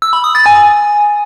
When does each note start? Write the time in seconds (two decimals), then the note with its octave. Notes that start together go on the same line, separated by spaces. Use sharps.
0.02 E6
0.13 B5
0.24 D#6
0.35 A6
0.46 G#5